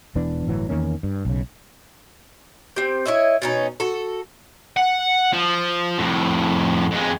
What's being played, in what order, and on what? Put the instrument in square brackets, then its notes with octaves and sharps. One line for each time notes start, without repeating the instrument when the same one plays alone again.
[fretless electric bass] E1 E3 B3 D4
G1 A2 E3 F#3
E2 D#3 A#3 C#4
G2
B1 C#3
[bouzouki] C4 G4
E4 C#5 D#5 E5
B2 C#4 D#4
F#4 A4
[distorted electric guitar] F#5
F3
F2 A2
F2 G#3